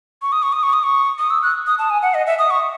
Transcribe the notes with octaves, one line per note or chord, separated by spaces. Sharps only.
C#6
D#6
C#6
D#6
C#6
D#6
C#6
D#6
E6
F#6
D#6
A5
G#5
F#5
D#5
E5
D#6
C#6